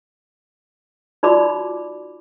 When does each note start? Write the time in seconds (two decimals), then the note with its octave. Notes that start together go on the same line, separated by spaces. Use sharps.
1.23 D#4 F4 F#4 D5 B5 D6